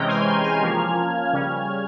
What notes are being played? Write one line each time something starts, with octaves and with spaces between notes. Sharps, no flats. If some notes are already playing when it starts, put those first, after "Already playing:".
Already playing: C3 E3 G#3 C#4 G5 A#5
G#5 C6
F6 G#6
F6 G#6
F3 A#3 C#4
C#3 G3 C#4